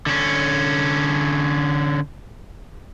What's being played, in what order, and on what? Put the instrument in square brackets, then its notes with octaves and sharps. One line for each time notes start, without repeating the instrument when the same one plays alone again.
[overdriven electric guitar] D3 C#4